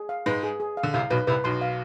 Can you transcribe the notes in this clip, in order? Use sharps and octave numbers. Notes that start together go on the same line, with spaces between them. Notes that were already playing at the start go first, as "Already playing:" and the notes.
Already playing: G#4
F5
G#2 G#3 B4
G#4
G#4
F5
D3
C2 C3 F5
B1 B2 B4
C2 C3 B4
B1 B2 C6
F5